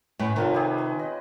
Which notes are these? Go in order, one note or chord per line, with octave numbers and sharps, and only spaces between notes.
A2 C#4 B4 B5
C3 D#3 C#4 F4 A4
G4 G#4
B4
D#5